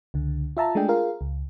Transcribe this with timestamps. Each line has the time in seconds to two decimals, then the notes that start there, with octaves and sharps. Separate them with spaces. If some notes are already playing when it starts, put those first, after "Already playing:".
0.14 C#2 D3
0.57 F4 E5 A5 A#5
0.75 G#3 A3 D4 G#4 G5
0.88 F4 G#4 A#4 F5
1.21 C#2